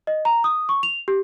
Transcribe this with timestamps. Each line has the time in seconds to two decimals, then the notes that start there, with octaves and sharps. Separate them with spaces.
0.07 D#5
0.25 A#5
0.44 D#6
0.69 C#6
0.83 F7
1.08 G4